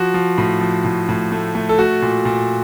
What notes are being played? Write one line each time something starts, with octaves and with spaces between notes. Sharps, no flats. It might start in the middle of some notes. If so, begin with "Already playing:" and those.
Already playing: F3 F#4
F3
A2
F3
A2
A2
A3
A3
A4
A3 F#4
A#2
A#2